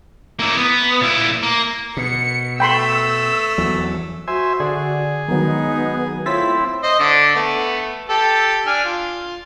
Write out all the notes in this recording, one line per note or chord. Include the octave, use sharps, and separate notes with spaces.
A#3 E4
B3
A#2 E4
A#3
B2 C#7
A3 G5 B5 C6 E6
E2 F#3
F#4 C5 E5 G#5
D3 G#4 D5 F#5
D#3 F#3 G#3 B3 D#4
A3 C4 E4 F4 C#5 A6 B6
C5 D#5
D3 D6
A3 B3
G4 A4
D4 G#5 F6
F4